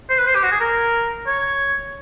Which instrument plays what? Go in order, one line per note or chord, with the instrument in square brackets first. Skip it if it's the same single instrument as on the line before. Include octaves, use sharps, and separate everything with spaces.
[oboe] C5
B4
C5
G4
F#4
G#4
A#4
C#5